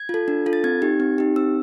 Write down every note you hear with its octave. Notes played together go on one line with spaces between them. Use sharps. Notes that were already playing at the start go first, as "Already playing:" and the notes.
Already playing: G#6
F4 A4
D4
F4 A4
A6
C4 G#6
D#4 G4
C4
D#4 G4
C4 E6